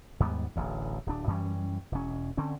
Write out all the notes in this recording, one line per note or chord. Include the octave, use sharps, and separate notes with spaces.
D#2 G#2 G3 B3
D1 A1 D2
D1 D4
F#2 E3 G3 C#4
E1 C#4
D3 C4 C#4